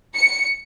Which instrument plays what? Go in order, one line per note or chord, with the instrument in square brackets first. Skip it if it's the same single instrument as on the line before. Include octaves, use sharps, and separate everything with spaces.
[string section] C#7